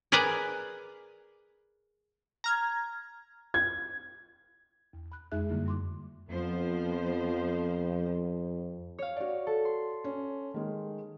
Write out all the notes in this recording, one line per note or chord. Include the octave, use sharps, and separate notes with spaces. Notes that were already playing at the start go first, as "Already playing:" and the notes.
G#4 A#4 B4 D5 G#5 A#5
A#5 F6 G#6
G#6
E2
B5 F#6
F2 G#3 D#4 G#4 E5 F#6
F#2 D3 G3 A#3 E4
G3 C6 D6
F2 F3 B3 C5
C#5 F5
F#4 D5
A4
C6
C#4
D#3 G#3